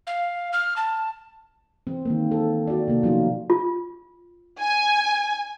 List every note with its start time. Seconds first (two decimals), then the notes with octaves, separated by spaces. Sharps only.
0.07 F5
0.53 F6
0.76 A5
1.87 E3 C4
2.05 D#3 G#3 A#3
2.31 A4
2.67 F#4 D5
2.88 C3 A#3
3.03 B2 F3 F#3 C#4 D#4 F4
3.50 F4
4.60 G#5